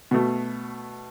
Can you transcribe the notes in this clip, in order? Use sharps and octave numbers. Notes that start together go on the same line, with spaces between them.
B2 A3